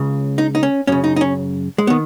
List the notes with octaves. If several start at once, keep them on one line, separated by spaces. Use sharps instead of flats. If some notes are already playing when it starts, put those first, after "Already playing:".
Already playing: C#2 C#3
D#4
D#4
C#4
F#2 C#3 C#4
D#4
D#4
C#4
G#3
D#3 B3